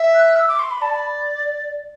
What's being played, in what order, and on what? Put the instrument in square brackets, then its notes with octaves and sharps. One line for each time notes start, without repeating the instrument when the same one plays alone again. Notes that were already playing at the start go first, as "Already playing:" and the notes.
Already playing: [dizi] E5
[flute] F#6
E6
D6
C6
B5
[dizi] D5 [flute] A5
[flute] B5